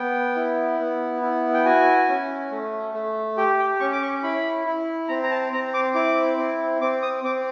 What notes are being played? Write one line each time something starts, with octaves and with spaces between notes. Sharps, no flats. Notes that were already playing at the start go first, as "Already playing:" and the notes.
Already playing: B3 G5
E4
B3
E4
G5
F#4 G#5
C#4
A3
A3
G4 G5
G5
C#4 C#6
D6
C#6
E4 B5
E4
C4 A#5
A#5
A5
C4 A#5
D6
E4 D6
C4
C4 D6
D#6
C4 D6